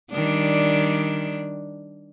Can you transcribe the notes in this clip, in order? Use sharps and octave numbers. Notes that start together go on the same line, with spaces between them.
D#3 G3 D4